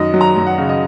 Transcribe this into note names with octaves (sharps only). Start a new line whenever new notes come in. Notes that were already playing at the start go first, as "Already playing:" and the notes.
Already playing: F#2 D#3 D#5
F#3
A#5
F#2
F#5
C#3
D#5